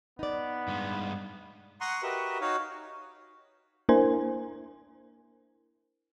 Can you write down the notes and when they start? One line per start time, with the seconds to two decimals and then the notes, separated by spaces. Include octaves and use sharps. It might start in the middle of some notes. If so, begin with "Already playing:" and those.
0.19 B3 D#4 D5
0.68 G2 G#3
1.81 F#5 A#5 C6 C#6 D#6
2.03 F#4 G4 A#4 B4 D#5 E5
2.41 D#4 F#4 C#5 F5
3.89 A#3 D4 E4 A#4 C5 G#5